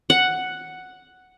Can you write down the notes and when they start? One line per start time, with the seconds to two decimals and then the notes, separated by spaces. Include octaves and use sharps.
0.10 F#5